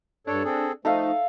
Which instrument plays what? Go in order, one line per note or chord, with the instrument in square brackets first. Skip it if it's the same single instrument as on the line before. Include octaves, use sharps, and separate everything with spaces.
[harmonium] G2 A4 C#5 [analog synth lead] D4
[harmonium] C4 G#4 A4
[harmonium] F3 A3 [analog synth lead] D#4 [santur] A4 E5 F5